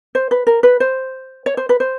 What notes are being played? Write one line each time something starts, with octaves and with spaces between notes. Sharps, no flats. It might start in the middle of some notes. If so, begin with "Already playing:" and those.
C5
B4
A#4
B4
C5
C#5
C5
B4
C5